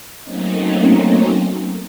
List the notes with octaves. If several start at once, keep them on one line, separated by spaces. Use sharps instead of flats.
F#3 A3 A#3 C4 C#4 D#4